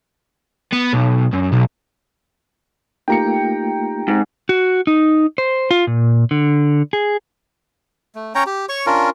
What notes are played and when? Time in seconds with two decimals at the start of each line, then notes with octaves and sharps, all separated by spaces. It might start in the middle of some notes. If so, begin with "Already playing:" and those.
0.73 B3
0.94 B1
1.33 F#2
1.52 B1
3.08 A3 A#3 D#4 F4 G4 G5 A#5 C#7
4.08 G#2 C4
4.49 F#4
4.87 D#4
5.38 C5
5.71 F4
5.87 A#2
6.31 D3
6.93 G#4
8.15 A3
8.35 C#4 C#5 G5 A#5
8.46 G4
8.69 C#5 C#6
8.86 C#4 D4 F4 A#4